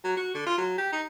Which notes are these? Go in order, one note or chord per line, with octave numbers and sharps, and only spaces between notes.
F#3
F#4
D3
F4
F#3
G4
D#4